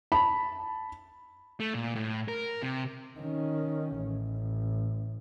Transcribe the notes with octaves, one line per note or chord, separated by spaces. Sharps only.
A5 B5
A3
A#2
A2
A#4
C3
D#3 C#4
A1